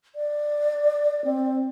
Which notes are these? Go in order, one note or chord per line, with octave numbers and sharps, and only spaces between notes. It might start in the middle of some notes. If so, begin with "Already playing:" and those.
D5
C4